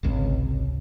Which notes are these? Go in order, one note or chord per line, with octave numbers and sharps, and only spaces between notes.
G#1 C#2 C3